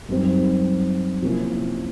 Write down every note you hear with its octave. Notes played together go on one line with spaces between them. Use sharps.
F#2 D#3 G3 C4
C3 F3 A#3 C#4 E4